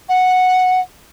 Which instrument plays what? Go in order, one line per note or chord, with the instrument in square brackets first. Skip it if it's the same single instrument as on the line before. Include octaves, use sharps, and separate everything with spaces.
[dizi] F#5